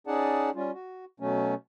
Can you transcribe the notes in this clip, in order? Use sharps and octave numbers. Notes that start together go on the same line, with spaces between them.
C#4 D#4 G#4 D5 F#5 A5
G3 C#4 F4
F#4
B2 F#3 A3 C#4